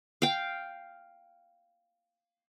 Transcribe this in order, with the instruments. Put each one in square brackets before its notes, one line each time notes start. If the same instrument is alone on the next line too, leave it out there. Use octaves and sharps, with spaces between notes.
[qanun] F5 G5